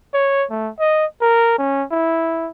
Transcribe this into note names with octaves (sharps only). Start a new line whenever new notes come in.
C#5
A3
D#5
A#4
C#4
E4